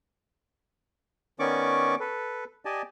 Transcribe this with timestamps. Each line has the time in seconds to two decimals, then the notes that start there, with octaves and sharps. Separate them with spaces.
1.39 D#3 B3 C#4 D5 C#6 D6
2.00 A4 B4
2.65 G4 D5 D#5 G#5 A5